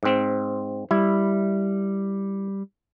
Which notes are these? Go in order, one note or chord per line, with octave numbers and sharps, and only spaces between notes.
G#2 C4
G3 E4